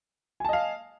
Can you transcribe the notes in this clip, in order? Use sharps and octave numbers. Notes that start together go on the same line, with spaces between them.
D#5 F5 G#5 A5